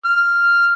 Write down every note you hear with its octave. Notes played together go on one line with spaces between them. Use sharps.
F6